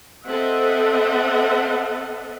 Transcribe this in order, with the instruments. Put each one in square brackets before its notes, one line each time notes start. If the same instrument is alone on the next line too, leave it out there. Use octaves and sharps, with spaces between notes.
[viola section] C4 A4 D#5 E5 F#5